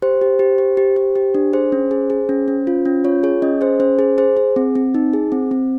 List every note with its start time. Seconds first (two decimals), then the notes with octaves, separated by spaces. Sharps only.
0.02 G4 C5
0.21 G4
0.39 G4
0.58 G4
0.77 G4
0.96 G4
1.15 G4
1.35 D4
1.53 G#4 C5
1.72 C#4
1.91 G#4
2.10 G#4
2.29 C#4
2.48 C#4
2.67 F4
2.85 C#4
3.04 F4 C#5
3.23 G#4 C#5
3.42 C#4 D#5
3.61 G#4 C5
3.80 C#4 C5
3.99 G#4
4.18 G#4 C5
4.37 G#4
4.56 C4
4.75 C4
4.94 D#4
5.13 G#4
5.32 C4
5.51 C4